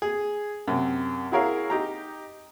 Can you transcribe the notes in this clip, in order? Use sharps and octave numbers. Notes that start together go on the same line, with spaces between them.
G#4
F#2 C3
E4 F#4 G#4 A#4 C#5 F5
D#4 G4 A#5